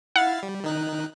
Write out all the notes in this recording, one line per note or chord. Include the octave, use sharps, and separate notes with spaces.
E4 F5 F#5 A6
G3
D#3 D#4 F#6